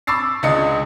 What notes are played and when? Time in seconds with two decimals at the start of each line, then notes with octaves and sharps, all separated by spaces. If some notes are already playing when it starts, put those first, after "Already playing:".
0.07 B5 C#6 D6 E6 A6 C7
0.43 C#2 G#3 D4 D#5 C#7